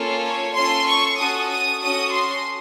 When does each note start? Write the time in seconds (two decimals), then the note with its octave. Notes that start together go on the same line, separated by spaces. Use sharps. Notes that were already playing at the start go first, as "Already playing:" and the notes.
Already playing: A#3 C#4 F4 A4
0.23 C#5
0.54 C#4 F4 A4 C6
0.86 C#6
1.18 C#4 F#4 A4 D#6
1.50 D#6
1.81 C#4 F#4 A4 D#6
2.13 C6